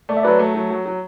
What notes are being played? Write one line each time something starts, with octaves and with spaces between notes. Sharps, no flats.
A3 D5
E5
F#3 B4 D5
A3
F#3
F#3
F#3